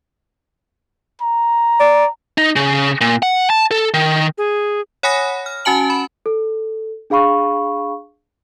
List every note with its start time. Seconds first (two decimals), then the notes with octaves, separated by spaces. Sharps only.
1.22 A#5
1.80 D5
2.38 D#4
2.56 C#3
3.01 A#2
3.22 F#5
3.50 A5
3.71 A4
3.94 D#3
4.38 G#4
5.03 C#5 F#5 G#5 B5 D#6 A#6
5.46 F6
5.65 C#4 F#4 G#5 A5 F#7
5.90 B5
6.26 A4
7.10 D4 G#4 F5 B5 C#6